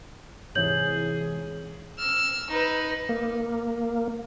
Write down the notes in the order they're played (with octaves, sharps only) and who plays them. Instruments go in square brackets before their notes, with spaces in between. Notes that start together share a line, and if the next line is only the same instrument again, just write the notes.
[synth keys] G#2 C3 E3 [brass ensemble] G#4 [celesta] C#5 G6 F#7
[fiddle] E6 F6
D#4 B4
[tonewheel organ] A#3